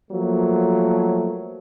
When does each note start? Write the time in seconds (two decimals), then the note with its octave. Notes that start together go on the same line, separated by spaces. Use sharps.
0.11 F3 F#3 A3 A#3